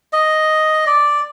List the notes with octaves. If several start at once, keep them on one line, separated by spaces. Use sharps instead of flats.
D#5
D5